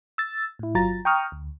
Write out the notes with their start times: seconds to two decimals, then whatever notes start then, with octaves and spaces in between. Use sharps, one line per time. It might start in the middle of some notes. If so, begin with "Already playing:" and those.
0.18 E6 A6
0.59 A2 E4
0.75 G1 F#3 F4 A#5 A6
1.05 G5 A#5 C#6 D#6 F6
1.32 D2